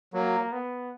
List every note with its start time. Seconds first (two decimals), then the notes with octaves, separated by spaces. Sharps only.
0.13 F#3 A#3
0.52 B3